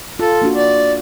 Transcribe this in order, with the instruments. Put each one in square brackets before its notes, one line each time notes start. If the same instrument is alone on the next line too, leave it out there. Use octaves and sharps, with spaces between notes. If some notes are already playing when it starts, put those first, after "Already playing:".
[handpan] F4 [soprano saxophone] A4
[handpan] A#3 D4 F#4
[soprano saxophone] D5